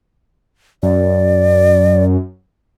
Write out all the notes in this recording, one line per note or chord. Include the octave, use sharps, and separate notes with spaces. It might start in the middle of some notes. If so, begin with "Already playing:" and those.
F#2 D5